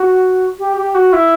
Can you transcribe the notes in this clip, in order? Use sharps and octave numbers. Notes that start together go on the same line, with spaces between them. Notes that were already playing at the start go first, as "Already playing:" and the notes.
Already playing: F#4
G4
G4
F#4
E4